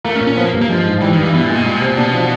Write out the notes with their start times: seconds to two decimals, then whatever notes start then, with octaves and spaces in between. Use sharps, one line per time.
0.05 A3 A#3
0.16 C#4
0.21 A#2
0.27 C#4
0.37 F3 B3
0.45 A#3
0.53 G2
0.62 A#3
0.70 F3 G#3
0.86 G#2
1.01 E3 G3
1.13 G2 D#3
1.23 E3
1.34 B2 E4
1.44 A#2
1.50 G#3
1.55 B2
1.65 A#2 G3
1.76 B2
1.82 C3
1.87 A#2
1.98 B2 D4
2.14 F3